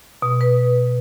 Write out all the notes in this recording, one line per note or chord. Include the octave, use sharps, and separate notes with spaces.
B2
B4